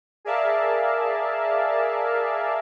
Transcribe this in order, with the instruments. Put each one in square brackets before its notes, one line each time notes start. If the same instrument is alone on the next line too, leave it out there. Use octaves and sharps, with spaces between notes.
[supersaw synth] G#4 A#4 D5 E5 F5 A5